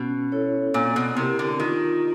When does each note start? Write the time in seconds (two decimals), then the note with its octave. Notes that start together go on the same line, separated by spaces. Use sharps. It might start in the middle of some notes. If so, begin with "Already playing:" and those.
Already playing: B2 C#4
0.32 E4 A4 C#5
0.74 A#2 C4
0.96 B2
1.17 C3 E4 G4 A#4
1.39 D3
1.60 D#3 F4